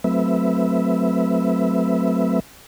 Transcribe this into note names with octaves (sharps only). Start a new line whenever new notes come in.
F#3 A3 C4 B4 E5